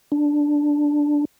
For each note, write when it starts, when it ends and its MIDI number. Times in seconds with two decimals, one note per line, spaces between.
0.12 1.25 62